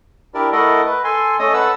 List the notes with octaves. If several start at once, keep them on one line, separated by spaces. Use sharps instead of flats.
D4 E4 G4 A#4 D5
A3 E4 A4 A#4 D#5 F#5
B4
A4 G#5 C6
A3 C#4 A4 D#5 D#6
A4 B4 F#5 E6